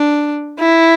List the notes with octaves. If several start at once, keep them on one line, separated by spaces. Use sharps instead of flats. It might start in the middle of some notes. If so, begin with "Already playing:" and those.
Already playing: D4
E4